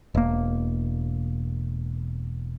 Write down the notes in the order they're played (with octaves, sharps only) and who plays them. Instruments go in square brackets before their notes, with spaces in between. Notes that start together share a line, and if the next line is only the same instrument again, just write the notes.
[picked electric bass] E1 A#3